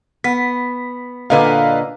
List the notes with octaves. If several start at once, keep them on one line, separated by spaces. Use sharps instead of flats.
B3 B6
A#2 D3 B4 D#5 F5 G#5